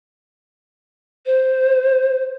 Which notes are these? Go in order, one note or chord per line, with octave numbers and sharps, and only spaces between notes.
C5